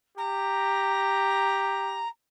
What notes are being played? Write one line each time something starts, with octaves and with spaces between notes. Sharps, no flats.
G4 A#5